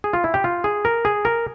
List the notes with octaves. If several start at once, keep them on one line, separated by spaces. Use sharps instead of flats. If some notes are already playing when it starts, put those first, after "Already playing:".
G#4
F4
E4
G4
F4
G#4
A#4
G#4
A#4